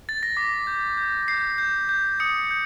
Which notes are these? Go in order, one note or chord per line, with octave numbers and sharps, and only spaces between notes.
A6
A#6
D6 B6
G6
G6
G6 C7
G6
G6
D#6 C#7
G6